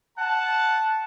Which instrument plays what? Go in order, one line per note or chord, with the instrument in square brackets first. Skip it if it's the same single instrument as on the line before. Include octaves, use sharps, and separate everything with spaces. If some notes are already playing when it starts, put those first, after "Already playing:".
[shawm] F#5 [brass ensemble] A5